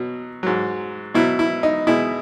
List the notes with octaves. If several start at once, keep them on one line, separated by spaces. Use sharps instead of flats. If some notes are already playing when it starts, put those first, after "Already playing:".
Already playing: B2 F#3
G#2 F#3
B2 F#3 E4
E4
D#4
B2 G#3 E4